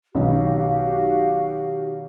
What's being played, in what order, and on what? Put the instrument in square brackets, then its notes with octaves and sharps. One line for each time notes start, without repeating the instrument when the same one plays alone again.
[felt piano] B1 B2 D#3 [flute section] F#4 G4 F5